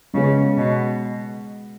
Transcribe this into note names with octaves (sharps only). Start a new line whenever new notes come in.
C#3 G#3 B3 G#4
B2